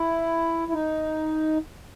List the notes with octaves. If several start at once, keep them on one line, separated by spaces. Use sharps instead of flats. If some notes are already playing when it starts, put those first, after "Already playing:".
Already playing: E4
E4
D#4